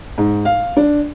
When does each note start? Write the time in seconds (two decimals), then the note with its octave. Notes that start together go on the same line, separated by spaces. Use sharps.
0.18 G#2
0.45 F5
0.77 D4